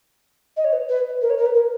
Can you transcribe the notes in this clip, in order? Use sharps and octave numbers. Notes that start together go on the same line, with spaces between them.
D#5
C#5
B4
B4
A#4
C#5
A#4
B4
A#4